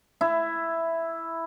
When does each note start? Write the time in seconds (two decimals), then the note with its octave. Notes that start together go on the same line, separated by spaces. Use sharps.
0.21 E4